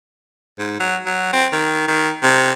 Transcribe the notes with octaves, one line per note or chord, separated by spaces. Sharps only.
G#2
F#3
F#3
C4
D#3
D#3
C3